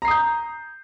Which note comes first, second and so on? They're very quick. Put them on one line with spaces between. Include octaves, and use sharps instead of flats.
A#5 C7 D#6 G6